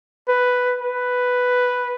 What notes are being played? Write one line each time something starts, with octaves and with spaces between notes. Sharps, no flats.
B4
B4